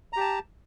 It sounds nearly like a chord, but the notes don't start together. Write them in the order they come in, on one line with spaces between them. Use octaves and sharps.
A#5 G4 A5